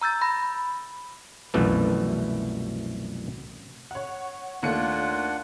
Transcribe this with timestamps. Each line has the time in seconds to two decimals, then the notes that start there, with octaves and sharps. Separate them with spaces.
0.01 A#5 E6 G6 A6
0.21 B5 A#6
1.54 C2 F#2 B2 E3 F3 A3
3.91 C#5 F#5
4.63 D#2 A3 D4 F4 F#5 C#7